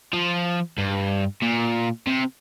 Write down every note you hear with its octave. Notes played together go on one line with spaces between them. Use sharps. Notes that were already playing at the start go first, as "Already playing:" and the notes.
F3
G2
A#2
C3